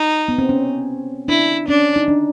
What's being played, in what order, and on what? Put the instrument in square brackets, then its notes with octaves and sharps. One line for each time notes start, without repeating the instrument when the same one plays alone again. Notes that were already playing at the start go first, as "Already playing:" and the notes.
Already playing: [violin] D#4
[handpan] B3
C4
C#4
[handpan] D4 [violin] E4
[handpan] C#4 [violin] D4
[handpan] D#4
D4